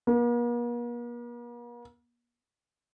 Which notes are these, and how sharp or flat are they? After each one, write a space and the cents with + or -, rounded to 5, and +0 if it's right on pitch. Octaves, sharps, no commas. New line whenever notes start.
A#3 +45